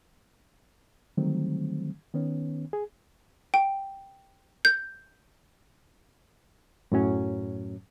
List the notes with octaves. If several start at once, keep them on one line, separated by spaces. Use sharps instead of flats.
D3 D#3 F#3 G3 A3 C4
D#3 B3 C#4
G#4
G5
G6
F#2 A2 F#3 C#4